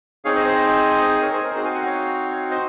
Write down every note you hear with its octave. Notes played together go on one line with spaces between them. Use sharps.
C4 D#4 G#4 C#5 F5
C5 D#5
C5 D#5
A#4 C#5
G#4 C5
A#4
C4 D#4 F#4 G#4 C5
F5 G#5
D#5 F#5
C#5 F5
C5 D#5